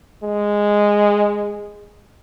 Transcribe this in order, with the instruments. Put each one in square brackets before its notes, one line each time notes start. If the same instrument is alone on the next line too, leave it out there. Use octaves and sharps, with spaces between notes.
[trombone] G#3